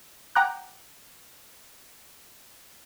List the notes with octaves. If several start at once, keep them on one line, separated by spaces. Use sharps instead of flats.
F#5 G5 A#5 D6 F#6